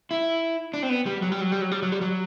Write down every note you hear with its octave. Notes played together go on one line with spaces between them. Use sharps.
E4
D4
C4
B3
G3
F#3
G3
F#3
G3
F#3
G3
F#3
G3
F#3